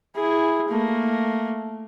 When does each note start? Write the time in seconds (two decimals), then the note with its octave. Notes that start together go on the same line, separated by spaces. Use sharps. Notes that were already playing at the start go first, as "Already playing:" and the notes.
0.15 E4 G#4
0.69 A3 A#3